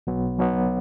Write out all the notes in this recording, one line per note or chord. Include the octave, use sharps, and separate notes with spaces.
B1 B2 F#3 B3
B1 B2 F#3 B3